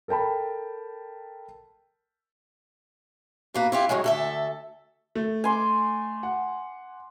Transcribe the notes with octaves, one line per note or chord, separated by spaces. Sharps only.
A4 A#4 G5 A5 B5
B2 A#3 B4
E4 F4 G4
A2 D#3 F#3 G#3
D2 A4 E5
A3
G#5 C6 D6
F#5